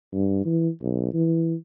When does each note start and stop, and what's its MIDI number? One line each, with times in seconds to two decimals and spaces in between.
0.13 0.43 43
0.45 0.68 52
0.82 1.09 35
1.14 1.55 52